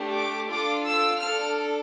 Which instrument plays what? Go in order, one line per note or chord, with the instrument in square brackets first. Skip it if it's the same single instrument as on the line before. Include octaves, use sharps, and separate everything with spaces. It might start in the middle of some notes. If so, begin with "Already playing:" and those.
Already playing: [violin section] A3 D4 G4
D6
D4 F4 A4 D6
E6
D4 A4 F6